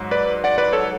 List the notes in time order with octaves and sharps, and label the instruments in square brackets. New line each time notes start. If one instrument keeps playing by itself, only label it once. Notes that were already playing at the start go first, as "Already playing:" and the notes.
Already playing: [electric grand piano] G#2 F#3
B4 D5
D5 F#5
B4 D5
A4 C#5